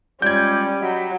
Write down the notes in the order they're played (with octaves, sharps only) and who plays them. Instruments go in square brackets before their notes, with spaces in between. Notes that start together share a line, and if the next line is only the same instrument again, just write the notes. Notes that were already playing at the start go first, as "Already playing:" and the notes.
[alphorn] G3 [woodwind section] G#3 F4 D5 [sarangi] C#4 [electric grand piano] G6 G#6
[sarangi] F#3 [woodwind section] D#5 G5 B5